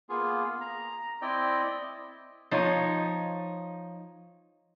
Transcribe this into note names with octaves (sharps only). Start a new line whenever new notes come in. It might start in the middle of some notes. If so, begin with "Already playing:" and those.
A#3 B3 F4 G#4
A#5
C4 E4 D5 D#5 G5
F3 D#4 C#5